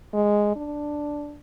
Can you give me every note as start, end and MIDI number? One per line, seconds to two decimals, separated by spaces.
0.14 0.53 56
0.56 1.38 62